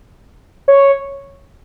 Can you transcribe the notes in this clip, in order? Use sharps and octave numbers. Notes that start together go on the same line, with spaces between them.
C#5